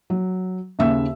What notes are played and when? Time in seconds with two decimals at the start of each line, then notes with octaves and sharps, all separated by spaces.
0.10 F#3
0.79 D#2 C#3 E5 E6